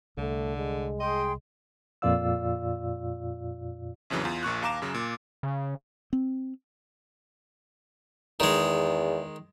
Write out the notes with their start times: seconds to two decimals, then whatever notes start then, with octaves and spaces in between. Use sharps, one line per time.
0.17 C2 D3 A3
0.57 G#3
1.00 G#4 D#5 G5 C6
2.02 F2 A#2 F4 D5 F5 E6
4.10 A#1 F2 C#3 E3 F#3
4.24 E2 F4
4.43 A#1 A#2 C#6 F#6
4.62 D#2 F5 A#5 D6 E7
4.82 F#2 C#3 F#3
4.94 A#2
5.43 C#3
6.13 C4
8.40 E2 D#3 G#3